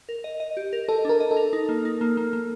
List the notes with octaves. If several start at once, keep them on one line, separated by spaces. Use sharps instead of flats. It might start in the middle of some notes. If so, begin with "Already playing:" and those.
A#4
D#5
D#5
G4
A#4
A4 D#5
D4 A#4
D#5
A4
A#4
D#4
A#3
D#4
A#3
A#3
A#3